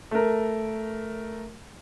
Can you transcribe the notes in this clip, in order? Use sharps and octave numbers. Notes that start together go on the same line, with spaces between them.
A3 A#4